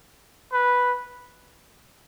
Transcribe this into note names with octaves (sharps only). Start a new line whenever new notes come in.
B4